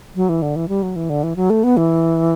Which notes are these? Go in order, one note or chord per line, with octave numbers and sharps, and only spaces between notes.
F#3
E3
D3
E3
G3
F#3
E3
D3
E3
F#3
A3
B3
E3